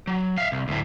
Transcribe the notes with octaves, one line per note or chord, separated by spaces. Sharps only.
F#3
E5 F5
C2
D2 A2